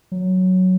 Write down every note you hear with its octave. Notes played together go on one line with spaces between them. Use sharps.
F#3